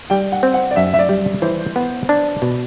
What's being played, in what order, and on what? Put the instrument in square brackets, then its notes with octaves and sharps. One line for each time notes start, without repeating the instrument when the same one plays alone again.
[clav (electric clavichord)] G3 [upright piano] G5
[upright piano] F#5
[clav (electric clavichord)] C4
[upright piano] F#5
D5
[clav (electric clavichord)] F#2 [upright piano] E5
[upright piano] E5
D5
[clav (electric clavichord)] G3
[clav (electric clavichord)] E3 [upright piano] C5
[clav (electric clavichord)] B3
D4
B2